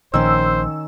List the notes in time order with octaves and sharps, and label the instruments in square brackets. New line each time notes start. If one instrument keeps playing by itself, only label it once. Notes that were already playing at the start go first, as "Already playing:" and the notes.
[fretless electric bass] A#1 [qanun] D#3 C#4 [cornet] C5 [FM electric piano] E6